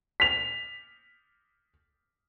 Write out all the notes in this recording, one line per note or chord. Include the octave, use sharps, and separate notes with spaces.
B6 F7